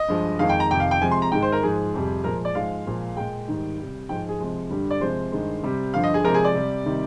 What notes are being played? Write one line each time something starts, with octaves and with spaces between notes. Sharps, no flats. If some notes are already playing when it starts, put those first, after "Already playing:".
Already playing: D#5
G2 F3 G#3
F2 D#3 G#3 F5
G5
A#5
F2 C3 D#3 G5
F5
G5
C3 F3 G#3 G#5
C6
A#5
G#2 D#3 G#3 G5
C5
A#4
G#2 F3 G#3 G#4
F2 C3 G3
A#2 F3 G#3 A#4
D5
G#2 F3 G#3 F5
A#2 F3 G#3
A#2 G#3 G5
G#2 D#3 G3
C3 G3
G#2 F3 G#3 G5
G#4
C3 F3 G#3
G2 D3 G3
D5
C3 F3 G#3 C5
G2 D#3 G#3
C3 G3
G2 D3 F3 F5
D#5
G#4
C3 F3 G#3 A#4
G#4
D5
C3 G3
C3 D#3 G3